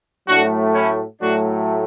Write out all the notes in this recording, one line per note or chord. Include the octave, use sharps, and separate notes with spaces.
A2 F#3 A3 D4 F#4
C#4 E4
A2 F#3 A3 D4 F#4